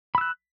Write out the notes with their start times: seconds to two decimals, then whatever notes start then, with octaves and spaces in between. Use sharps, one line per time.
0.15 B5
0.18 E6
0.21 F#6